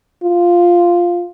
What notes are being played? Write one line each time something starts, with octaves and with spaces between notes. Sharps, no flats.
F4